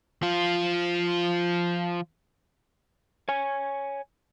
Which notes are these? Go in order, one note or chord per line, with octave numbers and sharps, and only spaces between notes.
F3 F4
C#5 G#5